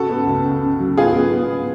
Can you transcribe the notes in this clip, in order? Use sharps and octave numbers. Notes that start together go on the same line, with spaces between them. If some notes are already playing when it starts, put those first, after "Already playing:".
Already playing: C#3 F#4 A4
B3
C#2
C#3
C#3
F#3
B3 F4 G#4
B3
B3